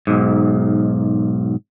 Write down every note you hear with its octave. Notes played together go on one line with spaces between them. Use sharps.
B1 G#2